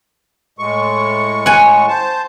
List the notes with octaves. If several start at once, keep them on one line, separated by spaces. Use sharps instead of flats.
A2 G#3 C#6
F#5 G#5
C5 A5